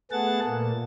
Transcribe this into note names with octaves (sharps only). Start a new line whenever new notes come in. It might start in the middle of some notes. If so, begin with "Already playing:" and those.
A3 B3 G#4 F#5 A5 A6
A#2 A#3